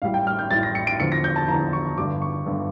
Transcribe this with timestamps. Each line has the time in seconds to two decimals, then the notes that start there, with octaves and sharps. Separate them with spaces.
0.02 A1 A2 G3 F5
0.14 G5
0.27 F6
0.39 G6
0.51 A1 A2 G3 A6
0.63 A#6
0.75 C#7
0.87 D7
0.99 E2 D3 F3 C#7
1.12 A#6
1.24 G6
1.36 A5
1.48 E2 D3 F3 A#5
1.73 C#6
1.97 G1 G2 D3 D6
2.22 C#6
2.46 G1 G2 D3